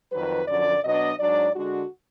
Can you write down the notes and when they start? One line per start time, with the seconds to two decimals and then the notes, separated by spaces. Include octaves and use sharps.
0.12 F2 D#3 F#3 B4
0.47 F#2 D3 F3 D5
0.83 B2 F#3 B3 D4 D#5
1.18 G#2 F#3 D4 D5
1.54 D3 G#3 D4 F#4